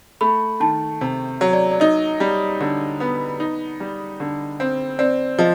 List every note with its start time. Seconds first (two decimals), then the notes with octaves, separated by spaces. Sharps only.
0.21 A3 B5
0.60 D#3 A5
1.01 C3
1.41 F#3
1.53 D5
1.71 D5
1.80 D#4 D#5
2.20 G3
2.61 D3
3.00 B3
3.40 D#4
3.80 G3
4.20 D3
4.60 C4
4.99 C4 D5
5.39 F3 D#5